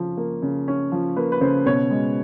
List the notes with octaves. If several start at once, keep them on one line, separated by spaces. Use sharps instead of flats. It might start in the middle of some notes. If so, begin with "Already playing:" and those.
Already playing: C#3 F3 C#4
A#3
C#3
C#4
F3
A#3 B4
B4
C#3 C5
B2 C#5
G#3